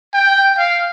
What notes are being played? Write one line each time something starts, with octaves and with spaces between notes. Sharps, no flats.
G5
F5